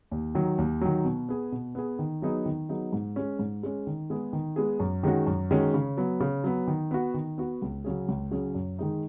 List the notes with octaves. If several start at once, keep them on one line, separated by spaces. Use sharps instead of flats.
D#2
D#3 F#3
D#2
D#3 F#3
B2
B3 G#4
B2
B3 G#4
D#3
F#3 B3 D#4 G#4
D#3
F#3 B3 D#4 G#4
G#2
G#3 C#4
G#2
G#3 C#4
D#3
G#3 B3 G#4
D#3
G#3 B3 G#4
F#2
D#3 G#3 C#4 F#4
F#2
D#3 G#3 C#4 F#4
C#3
F#3 B3
C#3
F#3 B3
D#3
B3 F#4
D#3
B3 F#4
C#2
C#3 F#3 C#4 G#4
C#2
C#3 F#3 C#4 G#4
F#2
D#3 G#3 D#4